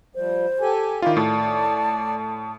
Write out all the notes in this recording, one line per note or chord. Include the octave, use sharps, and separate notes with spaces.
F3 G3 C5
G4 A4 G#5
D#3 E4 F4 D5 F5
A2 A5